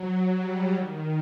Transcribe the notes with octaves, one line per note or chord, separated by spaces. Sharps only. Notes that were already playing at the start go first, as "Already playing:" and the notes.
Already playing: F#3
G3
D#3